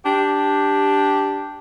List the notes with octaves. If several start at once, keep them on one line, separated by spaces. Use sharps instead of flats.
D4 G4